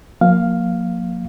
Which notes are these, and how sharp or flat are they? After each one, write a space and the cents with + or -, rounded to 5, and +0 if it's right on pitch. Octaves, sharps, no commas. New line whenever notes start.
F3 +45 A#3 +0 F5 +0